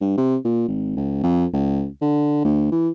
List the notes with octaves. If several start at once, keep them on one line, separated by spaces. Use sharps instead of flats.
G2
C3
A#2
G#1
C#2
F2
C#2
D3
D2
E3